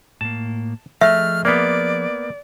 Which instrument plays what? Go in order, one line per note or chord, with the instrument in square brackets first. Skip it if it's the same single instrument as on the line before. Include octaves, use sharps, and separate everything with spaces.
[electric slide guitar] A2 A#3 [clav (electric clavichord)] A5
[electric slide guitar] F3 G#4 D#5 [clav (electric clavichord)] A3 [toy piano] E5 [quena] F6
[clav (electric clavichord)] A#3 B3 [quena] D5